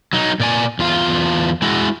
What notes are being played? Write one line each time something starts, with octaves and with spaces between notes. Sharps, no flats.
F#3 D#4
A#2 D5 G#5
E2 F4 F5
G#3 E4 F#4